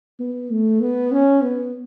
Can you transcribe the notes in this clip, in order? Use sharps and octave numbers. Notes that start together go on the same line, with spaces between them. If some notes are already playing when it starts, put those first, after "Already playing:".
B3
A3
B3
C#4
B3